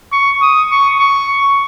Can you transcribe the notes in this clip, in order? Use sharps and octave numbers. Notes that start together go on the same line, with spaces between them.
C#6
D#6
C#6
C#6